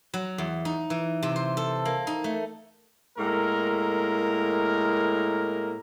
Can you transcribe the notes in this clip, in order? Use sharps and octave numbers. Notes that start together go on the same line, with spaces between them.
F#3
E2
D#4
E3
C3
C5
A4
A#3
D#4
A3
A2 G#3 A#3 A#4